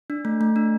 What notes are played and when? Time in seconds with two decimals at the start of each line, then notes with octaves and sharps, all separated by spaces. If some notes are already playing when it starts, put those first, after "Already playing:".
0.10 D4
0.25 A3
0.41 A3
0.56 D4